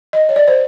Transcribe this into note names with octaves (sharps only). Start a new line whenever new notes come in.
D#5
C#5
D5
C5